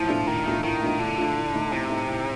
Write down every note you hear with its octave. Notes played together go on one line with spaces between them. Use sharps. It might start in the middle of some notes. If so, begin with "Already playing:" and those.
Already playing: A2 F3
A3 D4 F4
A2 D#3
A3 D4 F4
A2 D#3
A3 D4 F4
A2 D3
A3 D4 F4
A2
A3 D#4
A2 C3
A3 D#4
A2